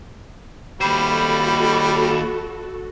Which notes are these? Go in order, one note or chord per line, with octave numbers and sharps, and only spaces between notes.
D#2 G3 F#4 A4 C5 B5